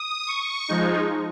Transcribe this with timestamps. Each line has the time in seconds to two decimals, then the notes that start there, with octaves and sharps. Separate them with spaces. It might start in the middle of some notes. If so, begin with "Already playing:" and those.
Already playing: D#6
0.27 C#6
0.69 F3 G#3 D#4